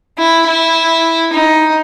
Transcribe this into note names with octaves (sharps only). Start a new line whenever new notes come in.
E4
E4
D#4